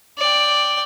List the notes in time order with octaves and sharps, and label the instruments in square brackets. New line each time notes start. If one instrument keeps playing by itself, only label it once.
[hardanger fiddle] D5 G5